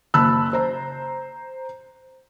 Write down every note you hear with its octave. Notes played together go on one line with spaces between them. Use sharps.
F#1 A5 B5 E6 F#6
C5 A#5